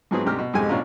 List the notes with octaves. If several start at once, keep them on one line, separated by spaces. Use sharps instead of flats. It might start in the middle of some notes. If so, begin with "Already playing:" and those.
G#2 F3 F#3 B3 C4 G#4
D2 G#2 C3 G4 A#5 F6
B2
F2 G#2 B2 G#3 G4 G#5
A1 B2 C#4 D4 F4 A#5